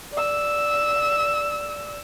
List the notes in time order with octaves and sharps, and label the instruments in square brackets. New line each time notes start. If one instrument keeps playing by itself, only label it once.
[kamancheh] D5 E6